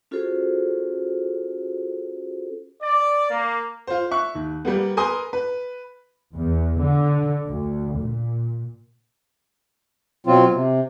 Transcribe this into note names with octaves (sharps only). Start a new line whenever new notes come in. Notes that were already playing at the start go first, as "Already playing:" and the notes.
C#4 F4 F#4 G#4 A4 C5
D5
A#3
F4 C5
E5 C#6 F#6
D#2
G3 A#3 B3
A#4 B4 G#5 C6 D#6
B4
E2
D3
D2
A#2
B2 F#3 C4 F4
C3